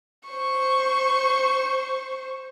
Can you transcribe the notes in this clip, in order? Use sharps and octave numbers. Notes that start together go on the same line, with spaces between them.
C5 C#6